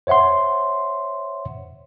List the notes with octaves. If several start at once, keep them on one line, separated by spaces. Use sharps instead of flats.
C5 C#5 E5 F#5 C6